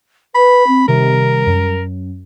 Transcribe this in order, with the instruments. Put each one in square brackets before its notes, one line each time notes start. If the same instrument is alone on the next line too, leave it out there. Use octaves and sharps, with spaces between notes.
[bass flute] B4 [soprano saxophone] B5
[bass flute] C4
[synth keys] C3 D#3 [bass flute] G3 [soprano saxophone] A#4
[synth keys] F#2